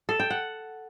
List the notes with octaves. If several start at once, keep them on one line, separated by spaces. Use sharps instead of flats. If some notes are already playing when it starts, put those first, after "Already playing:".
A4
G5
F#5